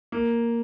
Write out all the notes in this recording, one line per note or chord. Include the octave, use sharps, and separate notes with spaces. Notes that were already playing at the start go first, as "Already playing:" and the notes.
A#3